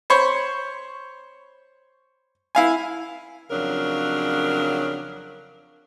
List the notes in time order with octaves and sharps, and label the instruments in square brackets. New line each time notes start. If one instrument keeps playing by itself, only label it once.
[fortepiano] C5 C#5 B5 C#6
E4 F5 G#5
[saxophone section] F2 C#3 F#3 D4 A#4